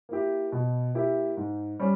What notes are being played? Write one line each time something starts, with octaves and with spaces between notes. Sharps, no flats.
A#3 E4 G4
B2
A#3 E4 G4
G#2
G3 C#4